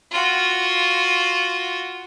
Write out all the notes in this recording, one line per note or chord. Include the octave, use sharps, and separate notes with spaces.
F4 F#4